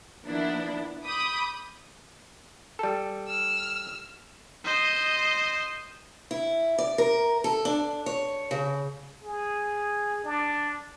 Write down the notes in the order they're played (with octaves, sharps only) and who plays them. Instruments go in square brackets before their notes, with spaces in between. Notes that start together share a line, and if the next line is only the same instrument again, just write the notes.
[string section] D#3 F3 A#3 B3 D4 E4
B5 D6 D#6 G6
[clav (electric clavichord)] G3 A4
[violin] E6 F6
[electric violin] C5 D#5
[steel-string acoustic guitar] E4
D5
A#4
A4
D4
C#5
C#3
[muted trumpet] G#4
D4